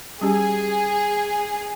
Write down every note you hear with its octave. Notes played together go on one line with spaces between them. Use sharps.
G3 C#4 G4 G#4